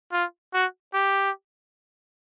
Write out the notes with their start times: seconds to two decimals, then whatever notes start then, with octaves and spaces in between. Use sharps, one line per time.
0.12 F4
0.54 F#4
0.94 G4